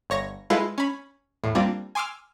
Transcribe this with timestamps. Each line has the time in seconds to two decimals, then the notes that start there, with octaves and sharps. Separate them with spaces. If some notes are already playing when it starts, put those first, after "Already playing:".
0.10 G1 C#5 A#6
0.50 G#3 E4 F4 A4 B4
0.78 C#4 B5
1.44 E2 A2
1.55 G3 A#3 C4 D4 F4
1.95 G#5 C6 D6 E6 F6